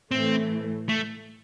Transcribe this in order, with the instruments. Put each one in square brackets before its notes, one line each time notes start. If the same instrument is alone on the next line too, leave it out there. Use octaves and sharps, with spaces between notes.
[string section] A2 E3 A3 [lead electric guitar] C4
[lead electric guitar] A3